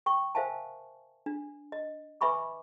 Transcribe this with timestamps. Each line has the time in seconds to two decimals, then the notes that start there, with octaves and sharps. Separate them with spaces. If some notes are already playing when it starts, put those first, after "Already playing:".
0.06 G5 C#6
0.35 A#4 C5 E5 F5 G#5 A5
1.26 D4
1.72 D#5
2.21 B4 E5 G#5 B5 C#6 D6